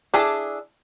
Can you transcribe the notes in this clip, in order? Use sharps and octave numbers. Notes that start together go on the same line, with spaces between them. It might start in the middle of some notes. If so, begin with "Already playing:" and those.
D4 E4 G#4 A4 D5